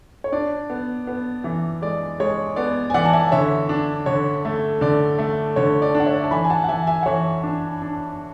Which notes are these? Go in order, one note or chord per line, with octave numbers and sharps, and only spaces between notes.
C#5
D4 D5
B3
B3
E3
G#3 D5
G#3 C#5
B3 D5
G#5
E3 D5 F#5
A5
E5 G#5
D3 C#5 E5
D4
D3 C#5
A3
D3 D5
A3
D3 C#5
D5
D4
F#5
C#5 E5
A5
E3 G#5 B5
G#5
F#5 A5
F#5
E3 E5 G#5
E5 G#5
F#5
E3 C#5 E5
D4
D4